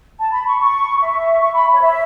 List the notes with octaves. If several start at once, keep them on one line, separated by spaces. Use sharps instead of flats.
A5
B5
C#6
C#6
E5
C#6
B5
C#5
E5